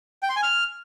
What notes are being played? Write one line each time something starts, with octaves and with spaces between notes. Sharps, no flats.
G5
C6
G#5
F6